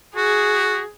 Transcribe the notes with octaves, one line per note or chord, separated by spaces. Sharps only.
F#4 G#4